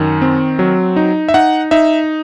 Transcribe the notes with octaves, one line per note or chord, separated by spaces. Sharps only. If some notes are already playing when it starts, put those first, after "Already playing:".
Already playing: F#2 D#3
C4
F#3
D#4
E5
D#4 F#5
D#4 E5